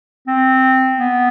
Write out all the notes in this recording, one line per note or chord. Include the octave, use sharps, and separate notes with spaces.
C4
B3